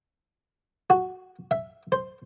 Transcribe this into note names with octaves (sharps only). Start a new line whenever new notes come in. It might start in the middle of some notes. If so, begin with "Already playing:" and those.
F#4
E5
C5